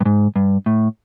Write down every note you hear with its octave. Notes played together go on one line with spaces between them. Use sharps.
G2
G#2
G2
A2